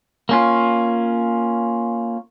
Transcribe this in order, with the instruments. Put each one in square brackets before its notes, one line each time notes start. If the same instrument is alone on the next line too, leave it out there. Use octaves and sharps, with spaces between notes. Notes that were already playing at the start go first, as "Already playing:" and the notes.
[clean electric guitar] A#3 C#4 F4